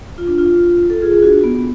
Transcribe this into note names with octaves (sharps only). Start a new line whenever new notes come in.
F4
D4
F4
A4
F4 G#4
G#4
D4 F#4
B3